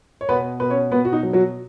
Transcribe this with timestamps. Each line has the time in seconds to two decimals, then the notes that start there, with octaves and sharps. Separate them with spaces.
0.21 C#5
0.29 B2 B3 B4
0.60 B2 B4
0.70 C#4 C#5
0.92 B2 B3 B4
1.05 F#4
1.13 D#4
1.23 F#3
1.33 F#3 F#4